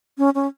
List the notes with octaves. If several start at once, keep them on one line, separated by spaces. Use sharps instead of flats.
C#4
C#4